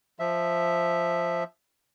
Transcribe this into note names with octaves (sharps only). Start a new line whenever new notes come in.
F3 E5